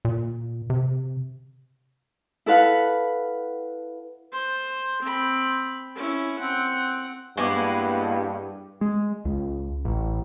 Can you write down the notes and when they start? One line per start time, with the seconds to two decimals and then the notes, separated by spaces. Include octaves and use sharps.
0.05 A#2
0.70 C3
2.46 E4 A4 B4 F5 F#5
4.32 C5
5.02 C4 B5
5.96 C#4 E4
6.39 C4 F#5
7.37 G2 G#3 A#3 B3 E4 C#6 D6
8.81 G#3
9.25 C#2
9.85 A1